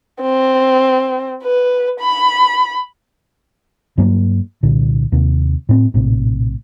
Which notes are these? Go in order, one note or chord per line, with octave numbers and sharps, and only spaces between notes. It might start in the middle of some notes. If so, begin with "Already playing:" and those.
C4
B4
B5
G2 F#3 A#3
C2 A#2 D3
D#2 C3
A2 C4
A#1 A2 C3